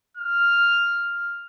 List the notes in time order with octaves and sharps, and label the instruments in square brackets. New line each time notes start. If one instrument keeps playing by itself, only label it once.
[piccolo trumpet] F6